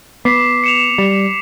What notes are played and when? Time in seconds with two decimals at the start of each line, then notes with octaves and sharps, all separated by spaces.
0.25 B3 D6 B6 C7
0.64 C#7 E7 F7
0.98 G3